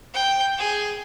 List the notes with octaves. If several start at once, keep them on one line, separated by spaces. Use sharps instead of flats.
G5
G#4